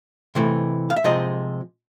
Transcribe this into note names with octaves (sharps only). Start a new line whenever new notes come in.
C3 E3 A3
F5
E5
C3 F3 G#3 D#5